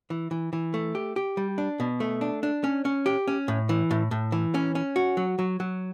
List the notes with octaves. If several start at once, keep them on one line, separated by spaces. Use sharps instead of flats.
E3
E3
E3
A3
G4
G4
G3
D4
B2
A3
D4
D4
C#4
C#4
G4
C#4
A2
E3
A2
A2
E3
C#4
C#4
F#4
F#3
F#3
F#3